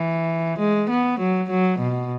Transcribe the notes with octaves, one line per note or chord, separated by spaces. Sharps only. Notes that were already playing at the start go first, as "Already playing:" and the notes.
Already playing: E3
G#3
B3
F#3
F#3
B2